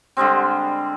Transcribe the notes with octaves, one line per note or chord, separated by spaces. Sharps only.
D3 G3 G#3 C4